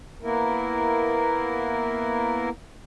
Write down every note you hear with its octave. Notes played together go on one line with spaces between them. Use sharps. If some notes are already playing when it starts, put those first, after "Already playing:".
A#3 B3 E4 A#4